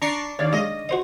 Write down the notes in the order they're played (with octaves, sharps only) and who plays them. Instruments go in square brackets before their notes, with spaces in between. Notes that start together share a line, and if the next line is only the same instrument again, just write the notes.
[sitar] D4 [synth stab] A#5 C#6 C7
[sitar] D#2 [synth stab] C#5 D5 F5
[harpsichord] G#3 A5 [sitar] D#5
[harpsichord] F#4 C5 D#5